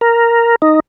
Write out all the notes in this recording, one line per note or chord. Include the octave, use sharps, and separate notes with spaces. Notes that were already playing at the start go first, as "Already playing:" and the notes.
A#4
D#4